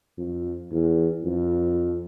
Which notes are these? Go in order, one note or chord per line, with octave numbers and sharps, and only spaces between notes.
F2
E2
F2